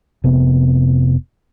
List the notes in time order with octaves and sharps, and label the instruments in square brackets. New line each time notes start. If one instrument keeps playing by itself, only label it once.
[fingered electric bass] F1 C3 B3